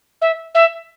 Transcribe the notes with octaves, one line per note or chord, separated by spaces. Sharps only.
E5
E5